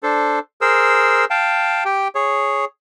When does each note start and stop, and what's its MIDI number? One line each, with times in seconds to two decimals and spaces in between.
0.03 0.39 62
0.03 0.39 69
0.03 0.39 72
0.61 1.25 68
0.61 1.25 70
0.61 1.25 72
0.61 1.25 88
1.30 1.84 77
1.30 1.84 79
1.30 1.84 81
1.85 2.08 67
1.85 2.08 79
2.15 2.65 68
2.15 2.65 73